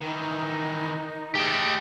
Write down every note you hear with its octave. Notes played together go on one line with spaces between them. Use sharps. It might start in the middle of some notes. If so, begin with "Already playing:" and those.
D#3 E3 D#4
A3 G4 G#4 D#5